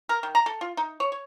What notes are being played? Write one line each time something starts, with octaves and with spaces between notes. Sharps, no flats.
A#4
D#3
A#5
A4
F4
D#4
C#5
C#5